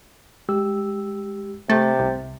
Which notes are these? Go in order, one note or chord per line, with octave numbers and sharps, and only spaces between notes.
G#3 G4 E6
C3 A3 G6 A6
C2